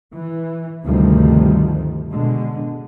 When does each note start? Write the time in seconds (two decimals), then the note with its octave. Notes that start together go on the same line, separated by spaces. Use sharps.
0.14 E3
0.83 D2 G2 C3 D#3 F3 G3
2.11 B2 D3 G#3